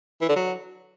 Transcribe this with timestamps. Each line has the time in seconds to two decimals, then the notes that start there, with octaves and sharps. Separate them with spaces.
0.21 E3
0.29 D3
0.36 F#3